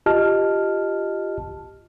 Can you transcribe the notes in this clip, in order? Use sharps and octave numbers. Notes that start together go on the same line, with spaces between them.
F4 G4 D#5 A5 F6